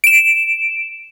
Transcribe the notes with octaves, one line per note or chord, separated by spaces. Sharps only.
D7 E7